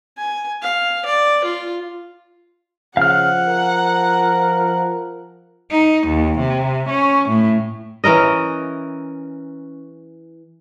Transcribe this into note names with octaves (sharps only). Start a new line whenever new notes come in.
G#5
F5
D5
F4
C#3 F3 F5 F#5 F6
A#4
D#4
D#2
C3
C#4
A2
E3 C#4 A#4 D#5